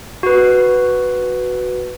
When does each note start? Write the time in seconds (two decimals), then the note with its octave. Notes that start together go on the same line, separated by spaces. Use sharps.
0.23 F#4 B4